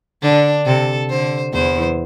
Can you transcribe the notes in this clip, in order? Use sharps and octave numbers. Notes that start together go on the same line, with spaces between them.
D3 D4
C3 A4
D3 C5
E2 E3 C5